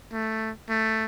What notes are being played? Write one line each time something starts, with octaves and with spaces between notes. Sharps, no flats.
A3
A3